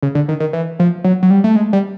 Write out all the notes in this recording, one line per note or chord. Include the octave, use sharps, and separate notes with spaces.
C#3
D3
D#3
D#3
E3
F3
F#3
F#3
G3
A3
G#3
G3